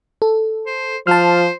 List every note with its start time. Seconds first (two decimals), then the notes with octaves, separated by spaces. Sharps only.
0.22 A4
0.66 C5
1.07 F3 C5 A5 F6